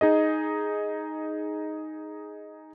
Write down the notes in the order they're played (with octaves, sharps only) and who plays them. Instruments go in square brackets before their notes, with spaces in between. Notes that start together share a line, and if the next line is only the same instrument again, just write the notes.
[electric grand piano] D#4 G#4 D#5